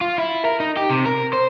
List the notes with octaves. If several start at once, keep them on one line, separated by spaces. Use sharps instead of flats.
F4
E4
A#4
D#4
G4
C3
A#4
C5